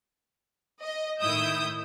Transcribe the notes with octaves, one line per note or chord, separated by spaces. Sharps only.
D#5
A2 D#3 E4 D#6 E6 G6